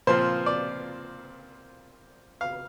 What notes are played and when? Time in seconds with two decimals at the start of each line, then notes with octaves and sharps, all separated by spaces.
0.07 A#2 F3 C4 C5
0.46 D5
2.41 F5